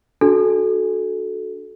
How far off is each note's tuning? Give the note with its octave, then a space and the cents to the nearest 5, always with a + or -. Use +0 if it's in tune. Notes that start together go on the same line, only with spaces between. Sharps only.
D4 +0 F#4 +0 A4 -20